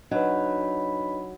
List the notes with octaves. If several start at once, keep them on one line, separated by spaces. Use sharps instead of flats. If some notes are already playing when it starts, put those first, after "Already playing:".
F#3 D4 D#4 B4 C#5 D#5 B5